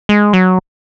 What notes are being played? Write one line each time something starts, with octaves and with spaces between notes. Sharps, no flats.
G#3
F#3